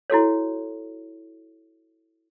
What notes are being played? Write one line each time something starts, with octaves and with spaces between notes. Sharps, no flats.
E4 F#4 A4 C#5